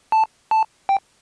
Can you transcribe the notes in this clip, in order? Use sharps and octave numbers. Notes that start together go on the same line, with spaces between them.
A5
A5
G5